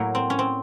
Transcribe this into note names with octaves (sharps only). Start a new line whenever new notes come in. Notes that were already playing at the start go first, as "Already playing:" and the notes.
Already playing: A2 F#3 A#3
C4
C#4
C4